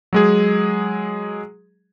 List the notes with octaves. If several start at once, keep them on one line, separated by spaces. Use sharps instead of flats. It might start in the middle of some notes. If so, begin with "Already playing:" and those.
F#3 G#3 G#4